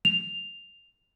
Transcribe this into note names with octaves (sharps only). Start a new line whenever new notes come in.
F7